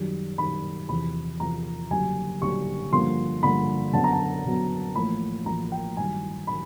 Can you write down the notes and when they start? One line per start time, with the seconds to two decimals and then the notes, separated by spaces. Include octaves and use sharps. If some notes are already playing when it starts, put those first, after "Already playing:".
Already playing: F#2 D#3 G3
0.38 F#2 D#3 G3 B5
0.88 E2 C3 F3 B5
1.40 E2 C3 F3 A#5
1.90 F#1 F#2 D3 G3 G#5
2.41 F#1 F#2 D3 G3 C#6
2.92 G2 D3 F3 A#3 C6
3.42 G2 D3 F3 A#3 B5
3.93 F#2 D3 F#3 B3 A5
4.04 A#5
4.13 A5
4.44 F#2 D3 F#3 B3
4.95 A1 A2 F3 A#3 B5
5.46 A1 A2 F3 A#3 A#5
5.72 G5
5.97 G2 D#3 F#3 G#5
6.47 D#3 F#3 B5